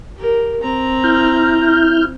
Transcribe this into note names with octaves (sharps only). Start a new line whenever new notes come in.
G4 A#4
C4 A#5
E4 F6 G6